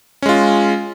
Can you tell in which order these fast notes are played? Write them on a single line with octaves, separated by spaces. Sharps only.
C#4 G#3 F4